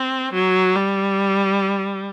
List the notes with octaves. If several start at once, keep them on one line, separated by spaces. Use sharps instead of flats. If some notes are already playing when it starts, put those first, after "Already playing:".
Already playing: C4
F#3
G3